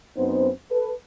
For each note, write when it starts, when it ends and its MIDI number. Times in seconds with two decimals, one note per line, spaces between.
0.17 0.49 42
0.17 0.49 59
0.17 0.49 60
0.17 0.49 63
0.17 0.49 72
0.71 0.92 69
0.71 0.92 71